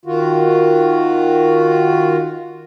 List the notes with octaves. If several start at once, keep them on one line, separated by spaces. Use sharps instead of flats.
D#3 F4 F#4